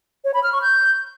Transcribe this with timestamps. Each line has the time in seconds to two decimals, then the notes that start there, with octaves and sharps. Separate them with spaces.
0.25 C#5
0.34 B5
0.43 F6
0.53 C#6
0.62 G6